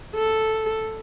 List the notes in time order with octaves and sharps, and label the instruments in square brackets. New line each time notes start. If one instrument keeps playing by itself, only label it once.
[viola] A4